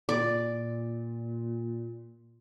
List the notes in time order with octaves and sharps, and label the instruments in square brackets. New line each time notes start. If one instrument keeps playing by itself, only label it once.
[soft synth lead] A#2 [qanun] D5